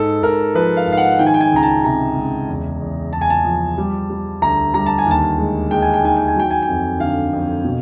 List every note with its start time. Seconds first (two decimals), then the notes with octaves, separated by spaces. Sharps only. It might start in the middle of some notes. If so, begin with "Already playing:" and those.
Already playing: G#2 A4
0.23 G#2 A#4
0.55 F3 B4
0.77 F5
0.87 G#2 F5
0.98 F#5
1.19 D#3 G5
1.27 G#5
1.34 G5
1.41 G#5
1.52 C#2 A#5
1.63 A5
1.84 C3 A#5
2.17 C#2
2.48 E2
2.81 E2
3.13 E2 A5
3.21 G#5
3.30 A5
3.45 F3
3.78 G3
4.10 G3
4.42 D2 A#5
4.74 G3 A#5
4.86 A5
4.98 G#5
5.07 D#2 A5
5.38 G#3
5.71 G#3 G5
5.82 G#5
5.94 G5
6.03 D#3 G#5
6.17 G5
6.28 G#5
6.36 F#3 G5
6.51 G#5
6.62 G5
6.68 F2
7.00 D3 F5
7.33 F2
7.64 B2